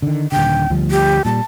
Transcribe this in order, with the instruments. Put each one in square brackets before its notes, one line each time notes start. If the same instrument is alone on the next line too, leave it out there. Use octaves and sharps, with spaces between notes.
[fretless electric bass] D3 D#3
[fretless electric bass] D#1 D3 [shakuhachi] G5
[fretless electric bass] D2 F3 G3
[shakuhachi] G4
[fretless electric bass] A#2 G3 [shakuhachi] A5